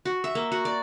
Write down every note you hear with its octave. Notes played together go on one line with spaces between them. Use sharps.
F#4
E5
A#3
F#4
D5